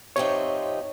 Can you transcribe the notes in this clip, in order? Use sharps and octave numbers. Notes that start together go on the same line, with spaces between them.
C3 F3 C4 D#4 C#5